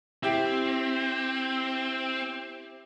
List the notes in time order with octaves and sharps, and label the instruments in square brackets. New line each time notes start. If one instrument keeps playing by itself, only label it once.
[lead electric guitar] C4 [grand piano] E4 G4